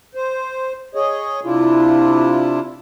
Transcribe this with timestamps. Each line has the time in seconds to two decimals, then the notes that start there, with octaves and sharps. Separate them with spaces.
0.15 C5
0.95 G#4 C#5 D#5
1.45 C3 D4 E4 F4